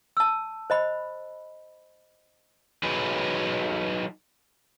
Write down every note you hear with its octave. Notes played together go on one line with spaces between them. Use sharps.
A5 E6
C5 D#5 B5
F#3 D#4 G#4 B4